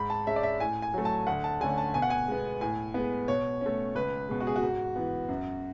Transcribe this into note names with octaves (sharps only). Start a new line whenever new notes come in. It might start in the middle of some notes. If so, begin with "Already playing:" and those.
Already playing: G#2 B5
A5
G#3 C#4 E5
D5
E5
A2 G#5
G#5
F#3 A3
A5
D2 F#5
A5
D3 A3 C#4 G#5
A5
B2 G#5
F#5
G#5
G#3 B3
A2 G#5
G#3 B3
B2 C#5
A3 C#4
C#2 B4
B2 G#3
F#4
G#4
F#4
G#2
E3 B3
F#2